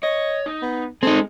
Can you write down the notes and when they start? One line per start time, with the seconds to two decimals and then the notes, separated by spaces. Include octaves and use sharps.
0.03 C#5 D#5
0.46 D#4
0.62 B3
1.03 G#3 C4 D#4 G#4 A4